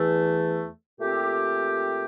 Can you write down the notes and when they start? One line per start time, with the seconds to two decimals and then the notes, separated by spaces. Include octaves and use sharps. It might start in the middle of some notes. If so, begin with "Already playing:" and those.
Already playing: E2 E3 A3
1.00 A#2 A3 C4 G4